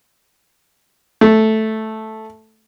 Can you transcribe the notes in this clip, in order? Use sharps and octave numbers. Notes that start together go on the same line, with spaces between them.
A3